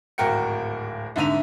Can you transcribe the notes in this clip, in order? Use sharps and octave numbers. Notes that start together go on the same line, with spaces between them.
D1 G#1 F#4 A#4 G5 C#7
C2 G#2 D3 E5 D#7 F7